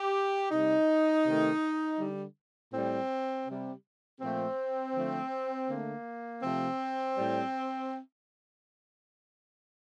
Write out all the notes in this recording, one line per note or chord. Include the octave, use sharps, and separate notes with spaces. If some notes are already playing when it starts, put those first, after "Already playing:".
Already playing: G4
C3 G3 D#4
C3 D#3 A3
D3 G3
A2 G3 C4
C3 G3
A#2 F3 A3 C4
D3 F3 A3
D3 A3 A#3
C3 F3 A3 C4
A2 G3